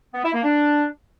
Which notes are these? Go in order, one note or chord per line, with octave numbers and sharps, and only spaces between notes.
B3
E4
A#3
D4